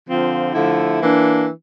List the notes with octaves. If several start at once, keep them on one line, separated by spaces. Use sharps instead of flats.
D3 F3 C4 F4
D3 F3 A3 E4
E3 A#3 D4